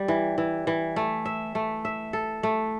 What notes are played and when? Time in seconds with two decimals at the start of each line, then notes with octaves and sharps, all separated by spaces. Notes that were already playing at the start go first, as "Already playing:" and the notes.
Already playing: G3
0.08 E3
0.38 E3
0.67 E3
0.96 A3
1.26 E5
1.55 A3
1.85 E5
2.13 A4
2.43 A3